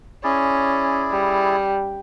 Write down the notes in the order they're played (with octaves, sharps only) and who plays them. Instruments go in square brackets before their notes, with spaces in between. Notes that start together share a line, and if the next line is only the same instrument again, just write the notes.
[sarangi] C#4 [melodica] E4 G#4 D5
[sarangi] G3